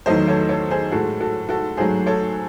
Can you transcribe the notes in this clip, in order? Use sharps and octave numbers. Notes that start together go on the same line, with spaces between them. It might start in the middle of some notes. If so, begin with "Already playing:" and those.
E2 D#3 F#3 A3 C5 D#5
A4 C#5
A4 C#5
G#4 C5
A2 G#3 F#4 A4
F#4 A4
F#4 A4
G#2 F#3 A3 G#4 C5
A4 C#5